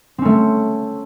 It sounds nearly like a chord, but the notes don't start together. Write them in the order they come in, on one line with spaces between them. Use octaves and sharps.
C4 C#4 A3